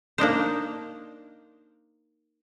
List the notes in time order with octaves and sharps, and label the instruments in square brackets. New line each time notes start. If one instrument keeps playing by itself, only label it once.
[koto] A#3 D4 D#4 C5